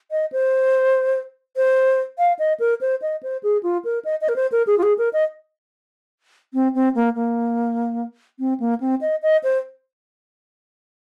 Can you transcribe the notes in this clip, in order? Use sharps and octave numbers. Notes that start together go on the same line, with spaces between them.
D#5
C5
C5
F5
D#5
A#4
C5
D#5
C5
G#4
F4
A#4
D#5
D#5
A#4
C5
A#4
G#4
F4
G#4
A#4
D#5
C4
C4
A#3
A#3
C4
A#3
C4
D#5
D#5
C5